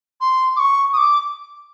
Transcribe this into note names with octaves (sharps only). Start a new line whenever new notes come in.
C6
D6
C#6
D#6
D6